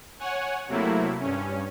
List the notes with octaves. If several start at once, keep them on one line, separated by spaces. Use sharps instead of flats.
C#5 F#5 G#5
C3 F#3 A3 A#3 E4
G2 C#4